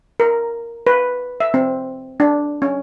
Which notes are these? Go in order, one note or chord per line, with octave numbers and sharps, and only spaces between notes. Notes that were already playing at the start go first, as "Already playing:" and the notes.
A#4
B4
E5
C4
D4
C#4